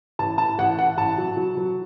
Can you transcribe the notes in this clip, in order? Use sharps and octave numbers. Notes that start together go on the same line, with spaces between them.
A1 A5
A2 A5
A1 F#5
A1 F#5
A1 A5
F#3
F#3
F#3